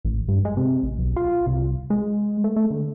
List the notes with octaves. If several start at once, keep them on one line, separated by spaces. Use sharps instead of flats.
A1
G2
G#3
C3
A1
B1
F4
C2
G#3
A3
A3
D3